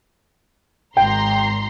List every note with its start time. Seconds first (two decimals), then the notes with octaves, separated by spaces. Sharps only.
0.97 G#1 G5 A#5 C6